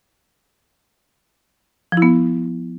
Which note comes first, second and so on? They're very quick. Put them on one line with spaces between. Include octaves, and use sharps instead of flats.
F3 E4 B3